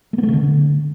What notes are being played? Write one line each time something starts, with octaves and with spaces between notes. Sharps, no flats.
A3
B3
A3
C#3
D3